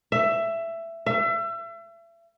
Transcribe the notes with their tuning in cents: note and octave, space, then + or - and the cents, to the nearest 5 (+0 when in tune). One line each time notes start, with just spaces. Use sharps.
E5 +15
E5 +35